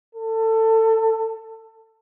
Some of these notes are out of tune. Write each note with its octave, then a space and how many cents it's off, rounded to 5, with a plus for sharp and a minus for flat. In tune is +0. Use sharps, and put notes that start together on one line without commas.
A4 +20